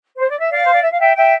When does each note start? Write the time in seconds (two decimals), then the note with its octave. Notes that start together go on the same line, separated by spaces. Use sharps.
0.18 C5
0.29 D5
0.39 E5
0.50 D5 F5
0.65 C5
0.73 D5
0.82 E5
0.91 F5
0.99 E5 G5
1.16 E5 G5